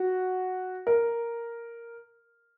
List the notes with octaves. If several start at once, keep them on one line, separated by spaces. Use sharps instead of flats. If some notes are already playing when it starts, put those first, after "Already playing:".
Already playing: F#4
A#4